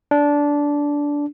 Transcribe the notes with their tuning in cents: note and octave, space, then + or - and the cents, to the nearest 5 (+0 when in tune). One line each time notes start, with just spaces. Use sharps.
D4 -15